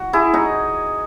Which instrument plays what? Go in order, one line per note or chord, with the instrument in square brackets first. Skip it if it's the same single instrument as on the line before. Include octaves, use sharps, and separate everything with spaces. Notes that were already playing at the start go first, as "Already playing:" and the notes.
Already playing: [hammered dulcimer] F#4
E4 G#4
D#4 F#4